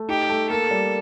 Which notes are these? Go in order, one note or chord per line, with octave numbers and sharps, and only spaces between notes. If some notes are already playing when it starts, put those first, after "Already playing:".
Already playing: A3
D#4 G4
A3
A#3 A4
G3